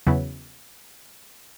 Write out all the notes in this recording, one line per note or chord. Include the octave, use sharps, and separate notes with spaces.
E2 C#3 F#3 B3 E4